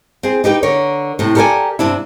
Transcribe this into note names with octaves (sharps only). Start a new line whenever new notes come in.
C4 G#4
D#4 G4 B4 G5
D3 A#4 C#5
A2 C3
G4 A4 A#4 C5 D5 G#5
G2 C3 D4 E4